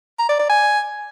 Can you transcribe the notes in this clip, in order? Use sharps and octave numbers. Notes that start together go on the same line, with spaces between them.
A#5
D5
D5
G#5